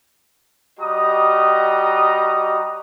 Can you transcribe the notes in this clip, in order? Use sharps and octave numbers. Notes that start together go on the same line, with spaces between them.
G3 F#4 G4 D#5 A#5 D#6